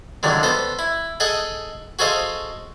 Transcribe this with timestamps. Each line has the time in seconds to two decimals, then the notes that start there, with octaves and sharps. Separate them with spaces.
0.23 C#2 F#2 D3 D#3 G#3
0.43 B3 A4 C5
0.79 E4
1.20 G#4 A4 D#5 F#5
1.99 F#4 G#4 A4 C5 D#5 F5